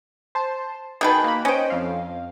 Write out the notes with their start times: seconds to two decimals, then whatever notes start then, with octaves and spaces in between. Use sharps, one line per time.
0.35 C5 A5
1.01 B2 D#3 G#4 B4 G5 A5
1.24 A#3 B5
1.45 C#4 C5 D#5 G5
1.70 F2 F5